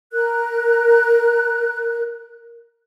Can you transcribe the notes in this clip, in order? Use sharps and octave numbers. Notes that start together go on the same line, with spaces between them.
A#4 F#6